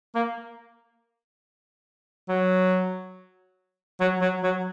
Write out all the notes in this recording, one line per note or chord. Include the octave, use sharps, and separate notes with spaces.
A#3
F#3
F#3
F#3
F#3